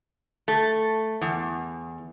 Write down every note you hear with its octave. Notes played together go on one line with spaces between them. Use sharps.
A3
E2